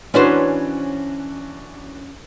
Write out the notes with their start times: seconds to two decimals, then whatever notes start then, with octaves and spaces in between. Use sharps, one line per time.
0.14 E3 C#4 D4 F#4 B4 C5